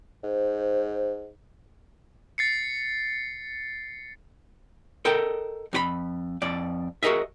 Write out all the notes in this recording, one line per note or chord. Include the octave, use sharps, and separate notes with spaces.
G#2 C5
A6 C7 C#7
A4 A#4 D#5 G5
F2 F#4 B5
F2 D5
F#4 G#4 A#4 D#5 E5